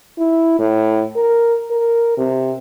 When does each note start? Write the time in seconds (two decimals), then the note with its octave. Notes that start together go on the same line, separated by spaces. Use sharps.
0.18 E4
0.59 A2
1.16 A#4
1.71 A#4
2.18 C3